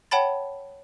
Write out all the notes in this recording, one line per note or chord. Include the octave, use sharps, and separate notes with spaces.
C#5 F#5 G5 A5 B5 A6